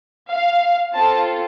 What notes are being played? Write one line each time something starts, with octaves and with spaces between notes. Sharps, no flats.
F5
C4 F4 A4 A5